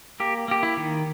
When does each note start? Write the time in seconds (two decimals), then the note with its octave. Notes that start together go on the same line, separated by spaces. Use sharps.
0.20 A#3 G4
0.48 A#3 G4
0.63 E4
0.77 D#3